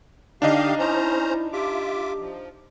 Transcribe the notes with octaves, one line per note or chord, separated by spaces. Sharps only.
D3 D4 D#4 G4 D#5 F5
C#4 E4 C5 A#5
F4 G4 E5 D6
F3